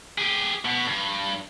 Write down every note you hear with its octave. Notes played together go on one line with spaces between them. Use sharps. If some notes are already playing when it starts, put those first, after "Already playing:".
G4 G#4
B2 B3
G2